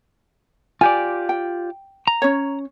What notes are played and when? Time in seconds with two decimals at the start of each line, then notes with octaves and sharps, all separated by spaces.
0.81 F4 G4 D5 G#5
1.29 G5
2.07 A#5
2.22 C#4 C#5